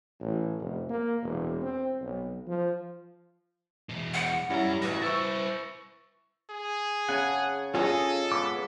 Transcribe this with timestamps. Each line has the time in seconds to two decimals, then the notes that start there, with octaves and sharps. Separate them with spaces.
0.20 A1
0.60 F1
0.89 A#3
1.22 E1
1.62 C4
2.00 B1
2.47 F3
3.89 E2 B2
4.14 F#5
4.50 F#2 G3 C#4 E4 A#5
4.82 A1 E3 F#4 B4 A#6
5.02 E4 C5 C#6 E6 A6
6.50 G#4
7.09 C#3 F#5 G#5 A5
7.75 C#4 F4 G#4 A4 D#5
8.32 G#3 B3 D6